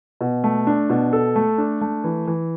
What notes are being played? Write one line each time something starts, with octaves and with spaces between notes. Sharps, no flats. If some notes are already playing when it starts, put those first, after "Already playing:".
B2
A3
D4
B2
A4
A3
D4
A3
E3
E3